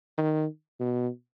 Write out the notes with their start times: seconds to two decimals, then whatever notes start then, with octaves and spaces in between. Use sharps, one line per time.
0.18 D#3
0.80 B2